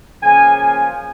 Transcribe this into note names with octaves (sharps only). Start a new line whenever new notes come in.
C#3 F3 A#3 G#5
G#5